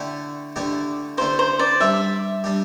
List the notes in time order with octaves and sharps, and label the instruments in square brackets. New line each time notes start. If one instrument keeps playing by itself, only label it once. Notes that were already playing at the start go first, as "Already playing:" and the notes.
Already playing: [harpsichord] D3 A3 E4 G4
D3 A3 E4 G4
[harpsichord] D3 A3 E4 G4 [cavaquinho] C5
[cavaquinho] C5
D5
[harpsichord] G3 D4 G4 [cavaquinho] E5
[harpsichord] G3 D4 G4